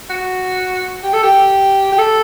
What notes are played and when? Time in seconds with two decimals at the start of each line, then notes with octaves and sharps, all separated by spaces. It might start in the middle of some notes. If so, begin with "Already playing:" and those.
0.10 F#4
1.03 G4
1.13 A4
1.23 G4
1.92 G4
1.98 A4